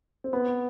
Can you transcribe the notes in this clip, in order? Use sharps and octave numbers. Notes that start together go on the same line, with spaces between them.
C4
B3